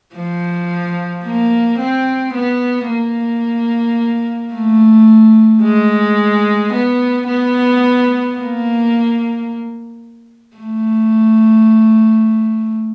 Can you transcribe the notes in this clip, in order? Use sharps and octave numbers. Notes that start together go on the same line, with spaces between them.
F3
A#3
C4
B3
A#3
A3
G#3
B3
B3
A#3
A3